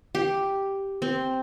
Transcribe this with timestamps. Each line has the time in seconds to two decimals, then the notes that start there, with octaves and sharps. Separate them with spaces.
0.15 G4
1.02 C4